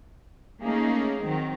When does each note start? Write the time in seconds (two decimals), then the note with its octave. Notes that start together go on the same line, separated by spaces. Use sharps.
0.61 A3 A#3 C#4 D#4 G#4
1.22 D#3 F#3 C4